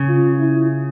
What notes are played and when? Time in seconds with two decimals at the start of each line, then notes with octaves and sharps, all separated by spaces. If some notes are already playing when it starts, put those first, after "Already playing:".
Already playing: C#3
0.09 F4
0.39 E4